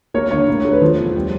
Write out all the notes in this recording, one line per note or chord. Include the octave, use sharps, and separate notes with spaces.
A#3 C#5
D3 C#5
A2
A3
B4
F3 C5
E2
G3